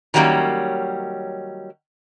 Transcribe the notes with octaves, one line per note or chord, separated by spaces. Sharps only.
D#3 F#3 G3 A#3 C#4